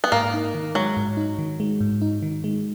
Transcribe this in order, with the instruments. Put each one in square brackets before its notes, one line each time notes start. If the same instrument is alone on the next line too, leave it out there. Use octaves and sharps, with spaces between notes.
[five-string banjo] B3
[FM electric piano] G#2 [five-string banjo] A#3
[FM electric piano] D#4
D#3
[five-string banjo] F#3 [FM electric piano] G#3
[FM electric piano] G#2
D#4
D#3
G#3
G#2
D#4
D#3
G#3